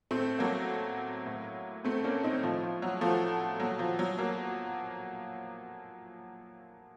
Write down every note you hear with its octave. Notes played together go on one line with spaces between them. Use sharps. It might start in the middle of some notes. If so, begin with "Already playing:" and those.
A2 A3 C4
F#3 A#3
A2
A3 C4
A#3 C#4
C4 D#4
A2 F3
F3
F#3
F3 A3
A#2 F#3
F3
F#3
F#3 A#3